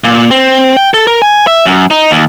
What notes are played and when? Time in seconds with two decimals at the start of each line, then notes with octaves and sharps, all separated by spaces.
0.04 A#2
0.31 C4
0.77 G5
0.94 A4
1.07 A#4
1.22 G#5
1.47 E5
1.65 F#2
1.91 D#4
2.11 D#2